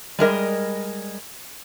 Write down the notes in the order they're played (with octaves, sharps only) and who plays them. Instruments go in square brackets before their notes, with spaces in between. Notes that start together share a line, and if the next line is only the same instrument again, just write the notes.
[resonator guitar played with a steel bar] G3 G#3 A#4 D#5